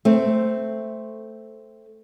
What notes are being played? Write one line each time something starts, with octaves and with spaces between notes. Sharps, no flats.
A3 C4